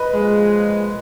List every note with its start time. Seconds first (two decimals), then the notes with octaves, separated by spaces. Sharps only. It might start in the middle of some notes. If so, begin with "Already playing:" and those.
Already playing: B4 D#5
0.12 A#2 F3 G#3